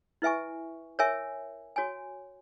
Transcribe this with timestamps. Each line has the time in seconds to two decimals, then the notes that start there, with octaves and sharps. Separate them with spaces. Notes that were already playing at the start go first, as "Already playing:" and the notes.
0.22 E4 B4 E5 G#5 C#6
0.99 A#4 C#5 E5 G#5
1.76 F#4 C#5 G#5